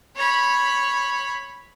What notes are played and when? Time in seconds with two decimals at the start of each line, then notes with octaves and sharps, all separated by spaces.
0.16 C#5 B5